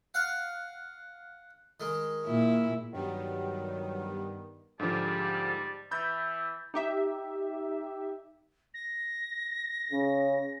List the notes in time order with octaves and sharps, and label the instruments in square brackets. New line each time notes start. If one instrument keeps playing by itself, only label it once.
[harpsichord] F5 F#5
D#3 G#3
[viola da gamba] A#2 E4
[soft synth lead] G2 [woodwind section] D#3 [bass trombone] F#3 [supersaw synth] G3 B3
[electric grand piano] G#2 D3 F3 [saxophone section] G3 [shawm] A5
[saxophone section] E3 [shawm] E5 [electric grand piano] B5 G6 A6
[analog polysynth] D#4 G4 E5
[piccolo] A#6
[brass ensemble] C#3